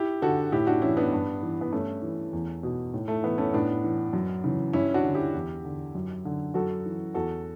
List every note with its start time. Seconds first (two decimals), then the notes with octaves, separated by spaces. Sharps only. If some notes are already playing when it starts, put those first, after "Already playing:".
Already playing: E4 G4
0.22 D3 F#4 A4
0.52 A2 E4 G4
0.67 D4 F#4
0.82 E3 C#4 E4
0.97 B3 D4
1.13 G2
1.43 E3
1.61 B3
1.72 G2 A3 C#4
2.02 E3
2.33 E2
2.63 B2
2.94 A2
3.08 A3
3.23 E3 B3
3.38 A3 C#4
3.53 A2 B3 D4
3.84 E3
4.13 F#2
4.44 C#3 E3
4.73 G2 C#4 E4
4.94 D4 F#4
5.04 D3
5.15 E4 G4
5.34 E2
5.65 D3
5.95 F#2
6.25 D3
6.54 F#2 F#4 A4
6.85 E3
7.14 E2 F#4 A4